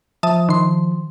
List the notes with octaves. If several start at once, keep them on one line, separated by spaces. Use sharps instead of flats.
F3 E5 A5 D#6
D#3 C6